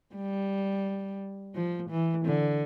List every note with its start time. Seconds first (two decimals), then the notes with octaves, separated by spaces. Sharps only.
0.15 G3
1.55 F3
1.90 E3
2.26 D3